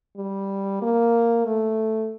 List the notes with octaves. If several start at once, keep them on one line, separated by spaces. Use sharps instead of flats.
G3
A#3
A3